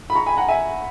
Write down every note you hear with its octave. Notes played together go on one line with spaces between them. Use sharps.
B5
A#5 C#6
G#5 B5
F#5 A#5
E5 G#5